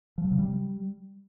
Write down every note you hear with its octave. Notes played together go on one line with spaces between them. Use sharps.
F3
F#3
C#3
G3